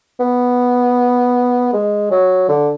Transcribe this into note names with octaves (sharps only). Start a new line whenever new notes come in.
B3
G#3
F#3
D3